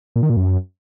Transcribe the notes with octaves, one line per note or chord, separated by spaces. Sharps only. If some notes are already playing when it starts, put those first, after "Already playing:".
A#2
D#3
A#2
F#2